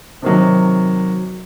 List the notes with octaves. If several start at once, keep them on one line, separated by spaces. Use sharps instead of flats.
C3 D#3 F#3